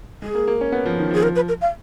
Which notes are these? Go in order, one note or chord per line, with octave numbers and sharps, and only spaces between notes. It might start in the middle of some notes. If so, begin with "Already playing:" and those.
G#3 G#4
A#3
A#3
C#4
B3
F3
D#3
F3 G#4
A#4
B4
A#4
F5